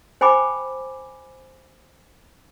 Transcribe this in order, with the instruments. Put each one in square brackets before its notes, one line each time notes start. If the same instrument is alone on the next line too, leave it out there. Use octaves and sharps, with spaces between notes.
[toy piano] C5 G5 G#5 B5 D6